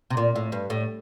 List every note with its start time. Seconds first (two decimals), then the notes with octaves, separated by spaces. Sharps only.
0.10 C3
0.17 A#2
0.36 A2
0.52 G2
0.70 A2